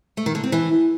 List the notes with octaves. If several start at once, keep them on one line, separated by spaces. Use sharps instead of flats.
A3
D#3
D3
C4
E3